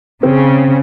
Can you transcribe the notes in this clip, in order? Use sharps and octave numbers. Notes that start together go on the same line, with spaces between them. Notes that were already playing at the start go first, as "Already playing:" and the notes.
C#3 C4